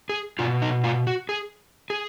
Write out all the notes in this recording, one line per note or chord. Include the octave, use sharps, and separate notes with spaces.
G#4
B2 F4
D#4
F4
F#4
G#4
G#4